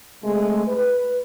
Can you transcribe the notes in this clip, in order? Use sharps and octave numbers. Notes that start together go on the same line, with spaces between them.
C3 G#3 A3
B4